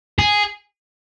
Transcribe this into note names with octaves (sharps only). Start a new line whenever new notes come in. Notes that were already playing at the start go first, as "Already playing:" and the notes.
G#4